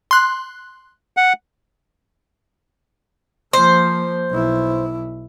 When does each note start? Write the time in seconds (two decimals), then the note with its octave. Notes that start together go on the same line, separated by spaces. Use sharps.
0.11 C6 F#6
1.17 F#5
3.53 F3 A#3 C5
4.30 B1 E4